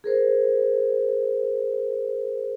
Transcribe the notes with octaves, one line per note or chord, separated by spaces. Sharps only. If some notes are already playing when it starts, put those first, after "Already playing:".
G#4 A#4 C5